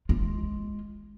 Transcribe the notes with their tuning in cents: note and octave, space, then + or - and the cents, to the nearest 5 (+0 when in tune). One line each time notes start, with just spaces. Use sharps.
G#3 +0 F4 +0